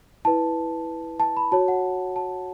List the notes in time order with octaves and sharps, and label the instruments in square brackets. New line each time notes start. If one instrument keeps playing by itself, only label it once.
[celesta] E4 B4 A5
A5
B5
F#4 C#5 A5
F#5
A5